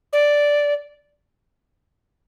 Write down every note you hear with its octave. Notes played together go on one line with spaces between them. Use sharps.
D5